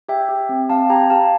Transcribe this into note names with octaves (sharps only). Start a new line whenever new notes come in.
G4 E5 G5
G4
C4
C4 F5 A5
G4 G5 A#5
G4 F5 A5